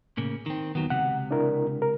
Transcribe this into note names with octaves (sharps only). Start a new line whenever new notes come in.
A2 C#3 A#3
D#3 C4
D#2 D#3 F#3 B3
C#2 C3 F#5
D4 E4 A#4
A#4